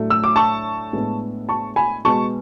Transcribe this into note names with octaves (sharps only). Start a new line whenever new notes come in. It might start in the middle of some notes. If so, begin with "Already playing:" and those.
Already playing: A2 F#3 A3 D4
E6
D6
A5 C#6
A2 G#3 B3 D4
A5 C#6
G#5 B5
B2 G#3 B3 A5 C#6